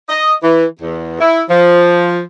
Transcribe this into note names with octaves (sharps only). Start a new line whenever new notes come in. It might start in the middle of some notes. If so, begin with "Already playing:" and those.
D#5
E3
E2
E4
F3